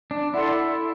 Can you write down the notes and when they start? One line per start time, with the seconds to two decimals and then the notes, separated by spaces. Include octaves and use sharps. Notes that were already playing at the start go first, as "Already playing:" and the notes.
0.11 D4
0.34 E4 A4 D5 F#5 C6